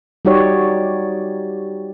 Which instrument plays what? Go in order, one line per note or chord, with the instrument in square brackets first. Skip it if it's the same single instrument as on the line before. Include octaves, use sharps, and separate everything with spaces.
[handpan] G3 D#4 F#4 G4 C#5 D5